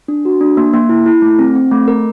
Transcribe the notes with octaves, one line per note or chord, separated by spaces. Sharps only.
D4
F#4
D4
A#3
A#3
E4
E4
A3
C4
C4
A3
A#4